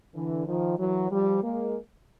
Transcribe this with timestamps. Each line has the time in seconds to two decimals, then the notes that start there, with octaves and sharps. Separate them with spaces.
0.15 D3 E3
0.46 D#3 F3
0.78 E3 F#3
1.10 F3 G3
1.42 G#3 A#3